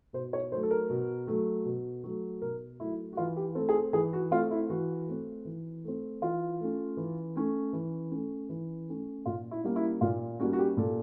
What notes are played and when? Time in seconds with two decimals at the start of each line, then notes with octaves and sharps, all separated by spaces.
0.13 B2 C5
0.33 C#5
0.52 F#3 C5
0.55 A3
0.63 A4
0.71 A#4
0.90 B2
1.27 F#3 A3
1.65 B2
2.04 F#3 A3
2.42 B2 A#4
2.80 F#3 A3 E4
3.13 F#4
3.17 E3 F4
3.36 G4
3.55 A3 C4 A4
3.69 G#4
3.75 A4
3.93 E3 G#4
4.13 F#4
4.31 A3 C4 F4
4.51 E4
4.70 E3 F#4
5.07 A3 C4
5.45 E3
5.84 A3 C4
6.22 E3 F4
6.60 A3 C#4
6.97 E3
7.36 A3 C#4
7.73 E3
8.11 A3 C#4
8.49 E3
8.88 A3 C#4
9.26 A#2 F4
9.51 E4
9.64 G3 A#3 C#4
9.76 E4
10.01 A#2 F4
10.40 G3 A#3 C#4 F#4
10.53 F#4
10.59 G4
10.77 A#2 A4